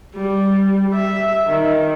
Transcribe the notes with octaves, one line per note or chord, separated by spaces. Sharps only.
G3
E5
D#3